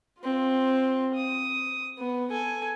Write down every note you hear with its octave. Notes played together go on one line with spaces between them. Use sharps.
C4 F4
D#6
B3
A4 G#5